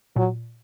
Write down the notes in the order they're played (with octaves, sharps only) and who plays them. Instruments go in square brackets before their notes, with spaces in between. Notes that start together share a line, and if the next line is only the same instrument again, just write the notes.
[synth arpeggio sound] A#2 [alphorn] F#3